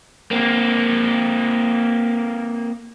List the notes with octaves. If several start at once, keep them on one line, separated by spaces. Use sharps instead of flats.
A#3 C4